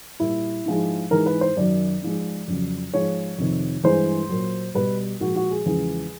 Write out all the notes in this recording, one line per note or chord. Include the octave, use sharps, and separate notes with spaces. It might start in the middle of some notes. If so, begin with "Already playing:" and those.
A#2 G3 E4
G#2 F3 G#3
G#2 E3 G#3 A#4
B4
C5
F#2 D#3 F#3 D5
G#2 F3 G#3
F2 C#3 F#3
G#2 F3 G#3 C#5
F2 C3 D#3
G2 E3 G#3 C5
A#2 F#3
B2 G3 B4
A#2 F3 G#3 F#4
F#4
G#4
E2 C#3 F3 G#3 G#4